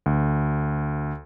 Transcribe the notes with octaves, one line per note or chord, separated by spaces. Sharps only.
D2